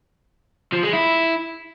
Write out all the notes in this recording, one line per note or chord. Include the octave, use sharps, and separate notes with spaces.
F3
G#3
E4